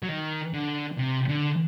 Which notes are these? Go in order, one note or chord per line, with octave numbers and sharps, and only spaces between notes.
F#3
D#3
D3
C3
D3